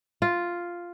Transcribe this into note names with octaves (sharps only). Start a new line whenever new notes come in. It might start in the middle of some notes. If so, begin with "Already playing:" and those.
F4